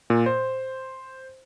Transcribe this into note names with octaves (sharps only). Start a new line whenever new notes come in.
A#2
C5